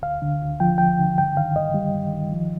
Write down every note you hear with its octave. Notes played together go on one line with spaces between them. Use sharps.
D2 F5
D3
D2
F3 G5
D2 G5
D3
G2 G5
D#3 F5
G2 D#5
G3
G2
D#3
F3